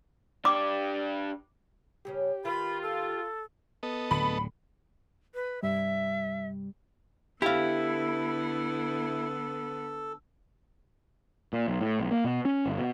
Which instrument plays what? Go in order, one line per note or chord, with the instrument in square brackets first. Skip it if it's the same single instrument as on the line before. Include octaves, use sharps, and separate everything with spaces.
[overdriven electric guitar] D4 G4 [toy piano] D6
[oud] G2 C#3 C#4 [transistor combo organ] G4
[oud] D#3 A#4 B4 [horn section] F4 [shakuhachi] B5
[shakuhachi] A4
[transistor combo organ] B3 A4 D#5
[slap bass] D1 D3 [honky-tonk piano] B5
[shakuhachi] B4
[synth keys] G2 C3 G3 [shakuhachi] E5
[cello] D3 B3 [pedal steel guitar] E4 [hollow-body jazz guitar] G4 F5 [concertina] A4
[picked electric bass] A#2
B1
A2
B1
A#3
B2
C#4
G1
B2